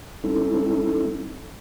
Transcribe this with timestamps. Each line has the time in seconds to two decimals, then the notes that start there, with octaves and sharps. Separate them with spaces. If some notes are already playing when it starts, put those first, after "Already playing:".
0.24 G3 C4 C#4 D#4 E4 A4